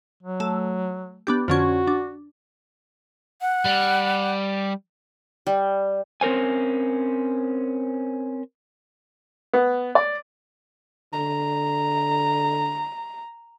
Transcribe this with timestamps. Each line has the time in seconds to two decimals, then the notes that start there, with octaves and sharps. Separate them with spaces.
0.23 F#3
0.40 A3
1.27 B3 D4 G4
1.48 F2 D3 C#4 F#4
1.87 D4
3.41 F#5
3.65 G3
5.47 G3
6.21 C4 C#4 A#4 C5 G#5
9.53 B3
9.95 D5
11.13 D3 A#5